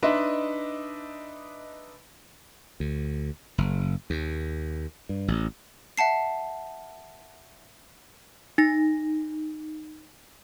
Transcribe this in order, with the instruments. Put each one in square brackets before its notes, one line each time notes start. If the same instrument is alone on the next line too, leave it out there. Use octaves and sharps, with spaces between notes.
[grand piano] D4 D#4 B4 D#5 E5 C6
[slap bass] D2
F#1
D#2
G2
A1
[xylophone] E5 F#5 A5 C7
[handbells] D#4 A#6